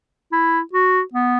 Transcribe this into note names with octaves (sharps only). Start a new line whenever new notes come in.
E4
F#4
B3